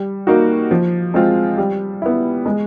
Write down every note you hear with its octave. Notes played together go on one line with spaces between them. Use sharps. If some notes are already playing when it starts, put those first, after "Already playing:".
Already playing: G3
A#3 D#4 F#4
F3
G#3 C4 F4
G3
B3 E4
G#3